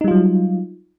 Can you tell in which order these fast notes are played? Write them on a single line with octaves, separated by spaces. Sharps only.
D#4 G3 F4 F#3